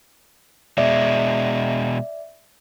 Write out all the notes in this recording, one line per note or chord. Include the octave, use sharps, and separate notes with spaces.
B2 G#3 D5 E5